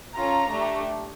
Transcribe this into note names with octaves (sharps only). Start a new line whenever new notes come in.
C#4 F4 A4 A#5
A3 D4 G4